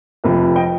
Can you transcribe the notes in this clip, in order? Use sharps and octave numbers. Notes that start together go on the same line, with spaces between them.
F1 F2 C3 F3
F3 D#5 G5